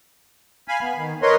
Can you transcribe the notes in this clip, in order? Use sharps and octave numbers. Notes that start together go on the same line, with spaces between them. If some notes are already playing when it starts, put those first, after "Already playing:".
F5 G#5 B5
B3
D#3
A#4 B4 C#5 D#5 C6